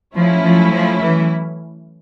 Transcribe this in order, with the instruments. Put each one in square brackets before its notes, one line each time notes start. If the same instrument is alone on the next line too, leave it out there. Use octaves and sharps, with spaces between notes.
[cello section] F3 [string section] F#3 A3 C#4 E4
[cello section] F3
F3
E3